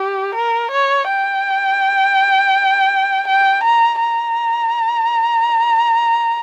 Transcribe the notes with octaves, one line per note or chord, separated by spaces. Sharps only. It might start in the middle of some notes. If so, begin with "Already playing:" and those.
Already playing: G4
A#4
C#5
G5
G5
A#5
A#5